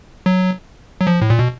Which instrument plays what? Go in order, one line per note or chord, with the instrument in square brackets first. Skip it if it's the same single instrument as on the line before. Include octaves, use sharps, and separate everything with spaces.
[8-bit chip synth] F#3
F#3
F3
A2
A#2
B2